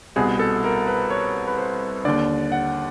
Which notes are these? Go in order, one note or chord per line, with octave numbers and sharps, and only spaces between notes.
C2 B2 G#4
A4
A#4
B4
C#5
B4
C5
D#2 D3 D5
F#5